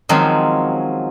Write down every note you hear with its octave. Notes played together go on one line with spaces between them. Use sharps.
D#3 F3 F#3 G#3 C4 C#4